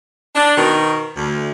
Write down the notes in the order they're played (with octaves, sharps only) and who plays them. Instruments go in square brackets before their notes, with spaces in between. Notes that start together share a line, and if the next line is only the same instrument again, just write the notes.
[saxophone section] D4
B2 D#3
D2